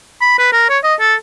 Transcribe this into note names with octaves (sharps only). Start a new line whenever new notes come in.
B5
B4
A#4
C#5
D#5
A4